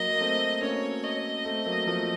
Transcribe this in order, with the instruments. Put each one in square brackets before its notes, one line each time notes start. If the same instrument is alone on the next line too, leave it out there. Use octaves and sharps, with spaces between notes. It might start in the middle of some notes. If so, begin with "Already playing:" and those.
Already playing: [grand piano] F#3 A#3 [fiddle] D#5
[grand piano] A#3
A3 C4
[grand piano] A#3 C#4 [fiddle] C#5
[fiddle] D#5
[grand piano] A3 C4
F#3 A#3
F3 A3